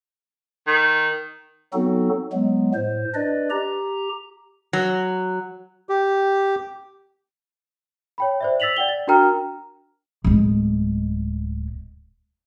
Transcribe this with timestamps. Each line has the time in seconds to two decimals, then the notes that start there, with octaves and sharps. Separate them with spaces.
0.67 D#3
1.73 F#3 B3 C4 D#4 F#4 A4
2.32 F#3 G#3 B3
2.74 A2 C5
3.14 D4 B4 D5 D#5
3.50 G4 A#5
4.73 F#3
5.89 G4
8.18 C#5 G5 B5
8.41 C5 D5 E5
8.60 E6 A6 B6 F7 F#7
8.76 D5 F#5 G5 G7
8.89 A6
9.07 D4 F#4 A#4 G5 A#5 F6
10.24 D1 G#3